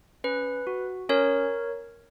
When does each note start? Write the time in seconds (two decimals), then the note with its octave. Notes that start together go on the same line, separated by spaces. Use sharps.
0.24 C#4 B4
0.67 F#4
1.09 C#4 A#4 C#5